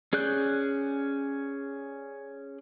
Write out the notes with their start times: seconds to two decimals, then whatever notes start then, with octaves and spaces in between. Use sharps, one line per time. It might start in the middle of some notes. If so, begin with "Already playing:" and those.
0.13 C#4 G#4 D5 F#6 G6